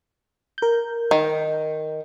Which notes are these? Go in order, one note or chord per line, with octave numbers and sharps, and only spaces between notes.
A#4 G6
D#3